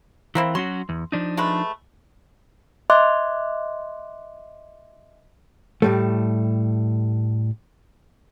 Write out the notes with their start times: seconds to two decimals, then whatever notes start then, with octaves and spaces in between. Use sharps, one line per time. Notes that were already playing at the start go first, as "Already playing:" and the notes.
0.35 E3 A#3 C4 E4
0.55 F#3 C#4 F#4 C6
0.89 E2
1.12 F3 D4 D#4
1.37 G#3 A3 B4
2.90 D#5 E5 C6 D6 F#6
5.82 A2 G3 A3